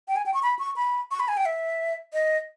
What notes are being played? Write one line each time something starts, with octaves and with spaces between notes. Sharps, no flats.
G5
G#5
G5
C#6
B5
C#6
B5
C#6
B5
G#5
G5
E5
D#5